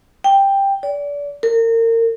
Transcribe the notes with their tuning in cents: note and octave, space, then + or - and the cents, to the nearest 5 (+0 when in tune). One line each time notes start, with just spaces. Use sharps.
G5 +10
D5 -30
A#4 -35